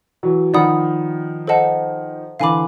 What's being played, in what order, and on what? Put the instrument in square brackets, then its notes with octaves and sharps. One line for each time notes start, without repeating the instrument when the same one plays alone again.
[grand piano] E3 F#3
[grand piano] D#3 F3 [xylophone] D5 F#5 B5 D#6
[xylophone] A4 C5 D#5 F#5 A5
[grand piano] D3 E3 [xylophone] F5 G#5 B5 D6